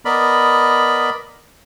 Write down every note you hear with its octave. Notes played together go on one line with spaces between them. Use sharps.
B3 A#4 D5 D#5 B5